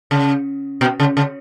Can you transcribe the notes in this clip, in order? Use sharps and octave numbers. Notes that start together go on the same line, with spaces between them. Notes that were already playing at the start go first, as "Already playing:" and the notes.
C#3
B2
C#3
C#3